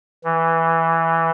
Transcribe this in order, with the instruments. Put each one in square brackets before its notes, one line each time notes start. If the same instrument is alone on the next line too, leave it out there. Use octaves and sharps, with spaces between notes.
[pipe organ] E3